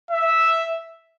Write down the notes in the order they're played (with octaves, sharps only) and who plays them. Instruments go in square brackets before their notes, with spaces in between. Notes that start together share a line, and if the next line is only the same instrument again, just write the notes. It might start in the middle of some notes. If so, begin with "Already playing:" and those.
[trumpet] E5